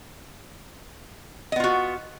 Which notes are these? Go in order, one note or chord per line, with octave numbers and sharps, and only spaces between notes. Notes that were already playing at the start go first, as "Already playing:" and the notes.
B3 F4 F#4 D#5